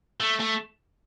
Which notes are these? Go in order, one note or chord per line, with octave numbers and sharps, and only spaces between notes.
A3
A3